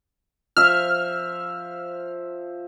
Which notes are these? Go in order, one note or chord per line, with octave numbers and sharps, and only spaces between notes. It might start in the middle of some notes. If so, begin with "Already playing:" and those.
F3 E5 F6